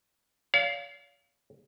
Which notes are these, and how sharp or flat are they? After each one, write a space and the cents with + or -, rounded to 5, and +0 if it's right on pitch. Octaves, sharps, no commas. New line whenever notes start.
C#5 +45 F5 +0